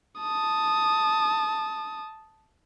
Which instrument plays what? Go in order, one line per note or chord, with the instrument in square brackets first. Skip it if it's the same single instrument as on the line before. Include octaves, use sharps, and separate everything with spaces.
[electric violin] A5 D#6